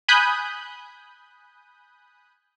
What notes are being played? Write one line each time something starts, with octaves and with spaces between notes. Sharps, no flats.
G#5 B5 D#6 F#6 G6